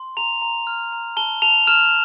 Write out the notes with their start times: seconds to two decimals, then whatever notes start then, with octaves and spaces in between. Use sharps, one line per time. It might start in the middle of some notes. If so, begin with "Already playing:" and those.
Already playing: C6
0.17 A#5 F7
0.42 A#5
0.67 F6
0.92 A#5
1.17 A5 G7
1.42 A5 F7
1.67 F6 E7